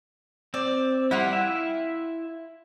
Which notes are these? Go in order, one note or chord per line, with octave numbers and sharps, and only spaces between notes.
C4 D5
G3 E4 F4 F#5 G5
E4 E5